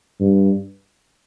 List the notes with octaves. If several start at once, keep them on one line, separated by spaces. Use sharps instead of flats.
G2